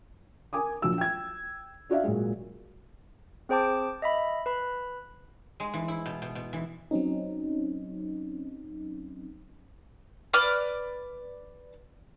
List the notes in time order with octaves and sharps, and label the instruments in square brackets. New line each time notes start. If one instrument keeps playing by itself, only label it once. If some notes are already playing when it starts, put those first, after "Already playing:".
[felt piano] A#4 G#5 D6 D#6
A#1 F#3 E6
G5 G#6
D4 F#4 D5 E5 F5
A#2 F#3 G#3
[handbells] C4 G#4 C5 G5 A5 D6
D#5 E5 B5
B4 B5
[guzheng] G#3
E3
E4
B2
B2
B2
E3
[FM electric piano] F#3 C4 C#4 D#4
[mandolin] B4 D5 D6 F6